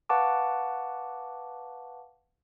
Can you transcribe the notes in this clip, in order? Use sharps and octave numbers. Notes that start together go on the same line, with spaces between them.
B4 F5 F#5 A5 C#6 D6